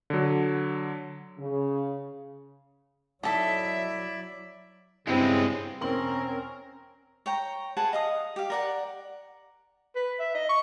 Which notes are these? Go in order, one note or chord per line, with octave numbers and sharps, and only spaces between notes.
D3 F#3
C#3
F#3 D#4 E4 A4 D5 E5
G2 C#3 G#3 B3 C4 E4
E1 C4 C#4 A#4 C6 F#7
C#5 G5 A#5
G#4 B4 F#5 A5
D#5 F5 D#6
G4 F5
A#4 D5 F#5
B4
E5
D#5
C#6